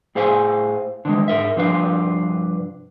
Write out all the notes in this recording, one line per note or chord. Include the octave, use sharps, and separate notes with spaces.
A2 G#4 C5 F5 G#5
D3 D#3 G#3
G#2 A#4 E5
C2 G2 F3 D4 B4 F5